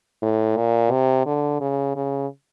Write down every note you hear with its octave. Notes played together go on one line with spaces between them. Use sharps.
A2
A#2
C3
D3
C#3
C#3